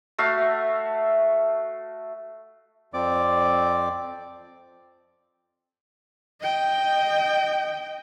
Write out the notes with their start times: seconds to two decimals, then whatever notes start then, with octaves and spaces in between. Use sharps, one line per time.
0.18 A3 F#4 E5 F5
2.94 F2 F3 C4 D5 D6
6.41 D#5 G5